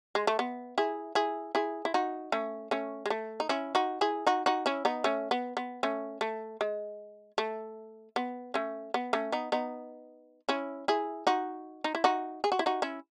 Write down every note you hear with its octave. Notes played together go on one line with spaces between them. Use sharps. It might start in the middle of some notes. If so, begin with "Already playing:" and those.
G#3
A3
B3
E4 G#4
E4 G#4
E4 G#4
E4
D#4 F#4
A3 C#4
A3 C#4
G#3
A3
D#4
C#4 E4
D#4 F#4
E4 G#4
D#4 F#4
D#4 F#4
C#4 E4
B3 D#4
A3 C#4
B3
B3
A3 C#4
A3
G#3
A3
B3
A3 C#4
B3
A3 C#4
B3 D#4
B3 D#4
C#4 E4
E4 G#4
D#4 F#4
D#4
E4
D#4 F#4
G#4
F#4
E4
D#4 F#4
C#4 E4